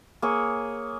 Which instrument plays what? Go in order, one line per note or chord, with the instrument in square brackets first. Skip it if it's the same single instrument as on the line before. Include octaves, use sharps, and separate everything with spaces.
[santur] A#3 G#4 C#5